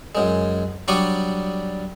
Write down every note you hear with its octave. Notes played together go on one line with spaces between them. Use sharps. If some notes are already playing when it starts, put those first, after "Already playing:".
F#2 G#3
F#3 G3 D4 D5 C#6 D#6